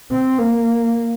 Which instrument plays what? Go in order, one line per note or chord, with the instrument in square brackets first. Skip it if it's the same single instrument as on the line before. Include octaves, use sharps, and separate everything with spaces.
[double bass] C4
A#3